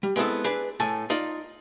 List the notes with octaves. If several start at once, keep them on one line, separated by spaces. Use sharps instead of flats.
G3
G#3 B3 C4 E4 A4
D4 G#4 B4
A2 A3 G#5 A5
D#4 F4 D5